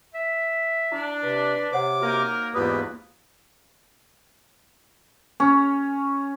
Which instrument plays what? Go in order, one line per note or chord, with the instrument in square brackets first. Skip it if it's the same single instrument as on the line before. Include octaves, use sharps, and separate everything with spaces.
[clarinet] E5
[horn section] D4 [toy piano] E4
[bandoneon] C3 [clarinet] B4
[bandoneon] C3 D6 [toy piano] C5 C#5 F#5
[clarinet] A#3 [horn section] D#4 A#4 [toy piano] F#4
[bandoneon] E2 G#2 B4 [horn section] B2 G3 [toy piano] F4 D#6
[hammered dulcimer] C#4